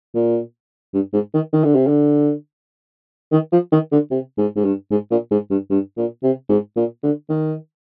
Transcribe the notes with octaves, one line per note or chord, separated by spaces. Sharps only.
A#2
G2
G#2
D#3
D#3
D3
C3
D3
D#3
F3
D#3
D3
C3
G#2
G#2
G2
G#2
A#2
G#2
G2
G2
A#2
C3
G#2
A#2
D3
D#3